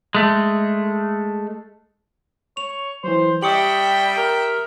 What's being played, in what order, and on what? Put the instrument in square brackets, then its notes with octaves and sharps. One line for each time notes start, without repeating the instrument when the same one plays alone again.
[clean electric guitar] G#3 A3
[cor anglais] C#5 [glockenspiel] F7
[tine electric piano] E3 F#3 [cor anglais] C5
[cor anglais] G3 [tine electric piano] G4 C#6 [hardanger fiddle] E5 G5 [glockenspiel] D#6 C#7 F#7
[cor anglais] A#4